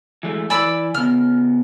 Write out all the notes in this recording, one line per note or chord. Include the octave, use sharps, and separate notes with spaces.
E3 G#3 A3
E3 E4 D5 G#5 B5 E6
C#3 B3 F6